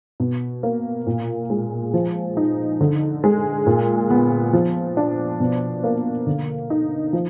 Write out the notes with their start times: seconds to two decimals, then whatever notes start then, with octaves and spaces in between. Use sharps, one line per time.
0.20 B2
0.63 A#3
1.06 A#2
1.50 G#3
1.94 F3
2.37 D#4
2.81 D3
3.24 G#3
3.67 A#2
4.11 B3
4.53 F3
4.97 D4
5.40 B2
5.84 A#3
6.27 D3
6.70 D#4
7.13 F3